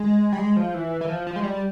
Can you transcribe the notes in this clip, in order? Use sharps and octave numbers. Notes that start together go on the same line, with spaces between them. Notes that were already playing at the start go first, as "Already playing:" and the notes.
Already playing: G#3
G3
G#3
F3
E3
E3
F3
F3
G#3
G3